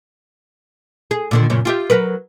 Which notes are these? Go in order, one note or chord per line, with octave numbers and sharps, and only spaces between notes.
G#4
A#2 D3 D#3
F#2 A#2 C#3
F4 G4 E5
F#3 A#4 B4